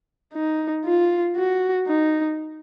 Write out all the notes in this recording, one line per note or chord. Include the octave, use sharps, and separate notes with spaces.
D#4
F4
F#4
D#4